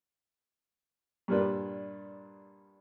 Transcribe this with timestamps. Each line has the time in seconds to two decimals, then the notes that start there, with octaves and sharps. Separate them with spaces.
1.28 G2 A#2 G3 D4 B4